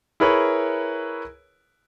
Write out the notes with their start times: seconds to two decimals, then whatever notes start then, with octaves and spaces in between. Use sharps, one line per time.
0.20 E4 G#4 A#4 B4 C#5